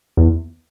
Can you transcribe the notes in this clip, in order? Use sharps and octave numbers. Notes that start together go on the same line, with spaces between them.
E2